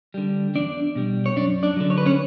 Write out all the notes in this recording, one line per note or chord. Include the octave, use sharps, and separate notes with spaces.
D3 G3
E2 D4 D5
B2 G3
C#5
F#2 D4 D5
D4 D5
D3 F#3
C#5
B4
C#4 C#5